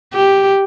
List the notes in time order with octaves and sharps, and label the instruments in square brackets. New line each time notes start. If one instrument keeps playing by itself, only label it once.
[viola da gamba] G4